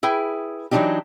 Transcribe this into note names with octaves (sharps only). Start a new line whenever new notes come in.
E4 G#4 B4 G5
E3 F#3 G3 D4 D#4 G4